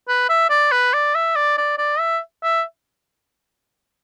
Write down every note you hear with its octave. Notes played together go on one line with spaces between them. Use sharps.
B4
E5
D5
B4
D5
E5
D5
D5
D5
E5
E5